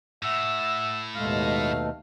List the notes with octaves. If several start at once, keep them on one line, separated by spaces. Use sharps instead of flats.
A2 E5 F#5 E6
D#2 B2 G#3 A3 F5